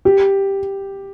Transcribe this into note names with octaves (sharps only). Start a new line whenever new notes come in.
G4